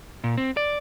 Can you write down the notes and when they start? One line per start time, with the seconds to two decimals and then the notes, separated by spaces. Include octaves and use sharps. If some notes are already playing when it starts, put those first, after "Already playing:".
0.24 A#2
0.37 C4
0.57 D5